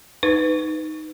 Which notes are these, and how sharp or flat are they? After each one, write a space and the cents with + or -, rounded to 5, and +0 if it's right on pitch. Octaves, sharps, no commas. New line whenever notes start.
D#4 +0 B4 +15